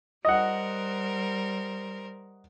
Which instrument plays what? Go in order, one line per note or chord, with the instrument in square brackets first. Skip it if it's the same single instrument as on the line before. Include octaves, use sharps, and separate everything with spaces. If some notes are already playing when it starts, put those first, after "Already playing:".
[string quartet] G3 A#4 C5 [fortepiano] D#5 F#5